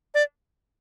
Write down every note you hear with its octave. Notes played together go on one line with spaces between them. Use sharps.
D5